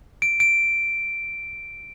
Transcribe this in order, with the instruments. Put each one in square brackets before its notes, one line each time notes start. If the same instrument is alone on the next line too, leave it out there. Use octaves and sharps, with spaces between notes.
[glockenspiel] D7
D7